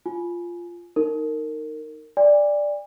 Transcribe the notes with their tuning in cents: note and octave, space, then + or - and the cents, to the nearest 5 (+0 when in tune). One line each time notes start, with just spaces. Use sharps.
F4 -5 G#5 +15
D#4 +0 A#4 -20
D5 +0 G#5 -45